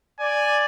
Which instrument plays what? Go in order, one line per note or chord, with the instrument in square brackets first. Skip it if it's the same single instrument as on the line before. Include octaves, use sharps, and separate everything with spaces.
[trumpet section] D5 [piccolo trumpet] G#5